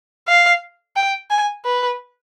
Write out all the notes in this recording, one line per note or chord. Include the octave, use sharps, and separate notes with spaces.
F5
G5
G#5
B4